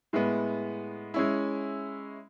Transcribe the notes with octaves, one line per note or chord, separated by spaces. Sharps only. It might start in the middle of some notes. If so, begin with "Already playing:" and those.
A2 G#3 B3
G#3 C#4 E4